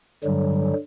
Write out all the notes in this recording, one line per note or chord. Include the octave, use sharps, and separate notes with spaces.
G2 D3 F#3 G3